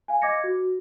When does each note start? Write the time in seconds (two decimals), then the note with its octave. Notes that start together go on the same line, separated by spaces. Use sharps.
0.08 F5 G#5
0.22 D#5 D6 G#6 A#6 C#7
0.44 F#4